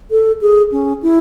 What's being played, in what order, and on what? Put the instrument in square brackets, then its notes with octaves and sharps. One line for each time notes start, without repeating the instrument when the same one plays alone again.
[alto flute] A4
G#4
C#4
E4